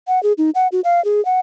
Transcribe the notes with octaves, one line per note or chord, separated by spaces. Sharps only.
F#5
G#4
D#4
F#5
F#4
F5
G#4
F#5